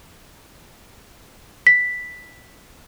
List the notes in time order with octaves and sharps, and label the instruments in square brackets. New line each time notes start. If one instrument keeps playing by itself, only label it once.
[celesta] B6